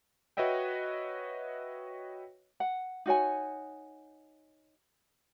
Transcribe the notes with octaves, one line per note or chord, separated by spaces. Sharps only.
F#4 B4 C#5 D#5 E5 G5
F#5
D#4 F#4 C#5 G#5